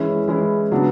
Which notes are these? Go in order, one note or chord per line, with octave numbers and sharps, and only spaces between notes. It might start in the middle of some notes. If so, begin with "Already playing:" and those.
Already playing: E3 G#3 C#4 E4
E3 G#3 C#4 E4
C#3 F#3 B3 D4